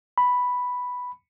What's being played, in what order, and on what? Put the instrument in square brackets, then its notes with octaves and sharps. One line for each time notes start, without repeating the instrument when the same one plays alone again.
[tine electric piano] B5